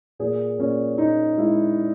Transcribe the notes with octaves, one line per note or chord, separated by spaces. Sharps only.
A#2 G#4
A#2 C#4
A#2 D#4
G#3 E4